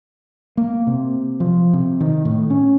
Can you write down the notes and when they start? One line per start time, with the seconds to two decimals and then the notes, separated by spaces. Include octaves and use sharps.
0.57 A#3
0.87 C3
1.40 F3
1.73 C3
2.00 D#3
2.25 A2
2.50 C#4